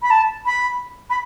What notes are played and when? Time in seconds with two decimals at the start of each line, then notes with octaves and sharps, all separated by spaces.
0.02 B5
0.10 A5
0.46 B5
1.10 B5